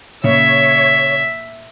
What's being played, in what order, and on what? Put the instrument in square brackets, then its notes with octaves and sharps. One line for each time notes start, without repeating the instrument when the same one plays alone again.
[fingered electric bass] A#2 [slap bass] C#3 [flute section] C#5 [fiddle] E5